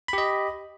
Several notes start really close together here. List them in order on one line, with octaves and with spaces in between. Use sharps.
B5 G4 D#5